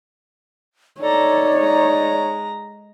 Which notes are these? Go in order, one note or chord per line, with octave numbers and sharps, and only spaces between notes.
D#4 A4 C#5 D5 A#5
G#3 A#5